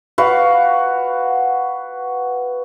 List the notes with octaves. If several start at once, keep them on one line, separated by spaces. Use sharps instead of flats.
F#4 B4 F5